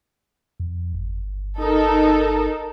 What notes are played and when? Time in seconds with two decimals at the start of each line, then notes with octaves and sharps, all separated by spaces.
0.60 F2
0.94 G1
1.59 D#4 A4 A#4